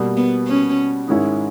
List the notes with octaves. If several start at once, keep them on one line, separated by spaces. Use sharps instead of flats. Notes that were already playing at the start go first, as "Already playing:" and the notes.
Already playing: B2 G3 A#3
B3
C#4
G#2 D#3 G#3 C#4 E4